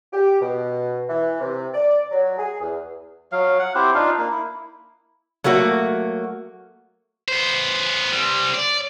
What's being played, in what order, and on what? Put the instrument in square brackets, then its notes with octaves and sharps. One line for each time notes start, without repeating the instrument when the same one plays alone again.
[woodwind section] G4
B2
E3
C3
D5
F#3
G#4
E2
[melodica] F#3 F5
F#5
C4 E4 G4 C5
D4 D#4 F4 F5
A#3
E4
[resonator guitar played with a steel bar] F#3 A3 A#3 F#4
[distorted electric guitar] B3 C5
G3 C4
D5